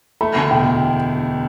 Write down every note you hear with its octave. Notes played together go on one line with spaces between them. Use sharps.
A3 B5
D2
E1 G5
E1